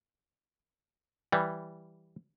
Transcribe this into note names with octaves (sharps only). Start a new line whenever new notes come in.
E3 G3